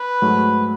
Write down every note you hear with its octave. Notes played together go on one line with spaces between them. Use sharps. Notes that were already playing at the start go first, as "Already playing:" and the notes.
Already playing: B4
G#2 F#3 A3